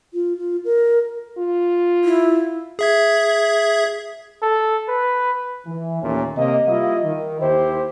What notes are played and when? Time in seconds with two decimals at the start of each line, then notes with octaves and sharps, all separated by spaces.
0.13 F4
0.37 F4
0.65 A#4
1.38 F4
2.04 E4
2.79 G#4 E5 G#6
4.42 A4
4.88 B4
5.66 E3
6.01 D#2 A#2 A3 C#4
6.36 C3 A#3 D#5
6.67 G3 A#3 E4 F4 D#5 F5
7.03 D#3
7.40 D#2 E4 G4 C5